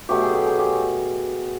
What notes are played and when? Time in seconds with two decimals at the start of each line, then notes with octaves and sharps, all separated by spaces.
0.09 B2 F#3 A3 G4
0.22 G#4
0.34 G4
0.46 G#4
0.59 G4